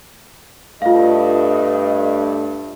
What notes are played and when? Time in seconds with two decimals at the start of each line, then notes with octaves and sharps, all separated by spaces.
0.82 G2 A3 F4 D#5 F5